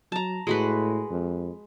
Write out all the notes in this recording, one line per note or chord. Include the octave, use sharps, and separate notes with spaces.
F#3 A5 A#5
A2 G#3 F#4 B4
F2